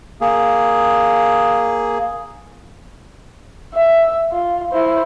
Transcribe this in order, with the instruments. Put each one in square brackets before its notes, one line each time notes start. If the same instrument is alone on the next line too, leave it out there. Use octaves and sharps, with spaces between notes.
[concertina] A#3 G#4
[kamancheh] E5
F4
E4 C5